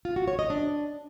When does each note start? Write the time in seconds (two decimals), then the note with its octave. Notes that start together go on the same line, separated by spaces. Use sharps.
0.05 F4
0.16 F#4
0.28 C#5
0.39 D#5
0.50 D4